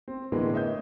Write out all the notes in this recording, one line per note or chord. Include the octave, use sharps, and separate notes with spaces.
C4
A2 D3 E3 G#3 A#3 B3
C#5 D#5 E5 D#6 G6